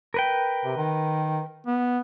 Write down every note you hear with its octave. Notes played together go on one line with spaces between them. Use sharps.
A#4 B4 G5
C3
D#3
B3